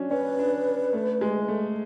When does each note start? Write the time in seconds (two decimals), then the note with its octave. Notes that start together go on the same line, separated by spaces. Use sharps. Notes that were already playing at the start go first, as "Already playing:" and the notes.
Already playing: F#3 C#4 D4
0.11 C#4 B4
0.39 D4
0.93 A3
1.21 G#3
1.48 A3